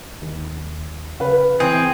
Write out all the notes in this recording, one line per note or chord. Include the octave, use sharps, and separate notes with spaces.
D#2
C#3 B4 F5
E3 C4 G#4